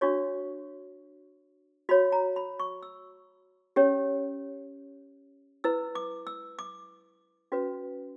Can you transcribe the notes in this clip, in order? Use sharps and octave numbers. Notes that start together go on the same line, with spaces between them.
D4 F#4 C#5 C#6
F#4 C#5 B5
A#5
B5
C#6
E6
C#4 G4 C#5
E4 B4 E6
D6
E6
D6
C#4 F#4 B4